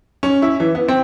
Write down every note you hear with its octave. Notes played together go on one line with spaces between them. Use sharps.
C#4
E4
E3
B3
C4